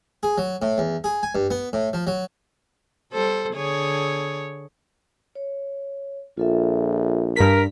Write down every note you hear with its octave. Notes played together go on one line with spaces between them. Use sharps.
G#4
F#3
A2
E2
G#4
G#5
G2
B3
A2
F3
F#3
G3 A4 C5
D3 G#4 C#5
C#5
A#1 F4 A4 E5
G2 A#4 B6